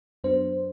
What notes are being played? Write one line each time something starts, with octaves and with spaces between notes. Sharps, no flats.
F#2 F#3 B3 D4 C5